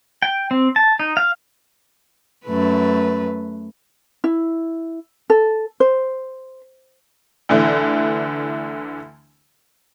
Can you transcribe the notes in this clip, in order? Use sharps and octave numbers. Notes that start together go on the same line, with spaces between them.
G5
C4
A5
D#4
F5
F#2 A3 B4
E4
A4
C5
D2 D3 E3